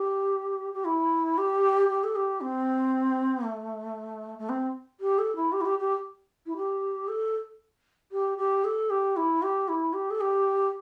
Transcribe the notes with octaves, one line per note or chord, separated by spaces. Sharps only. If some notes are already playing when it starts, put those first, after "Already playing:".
Already playing: G4
G4
E4
G4
G4
A4
G4
C4
A3
A3
C4
G4
A4
E4
G4
E4
G4
G4
E4
G4
A4
G4
G4
A4
G4
E4
G4
E4
G4
A4
G4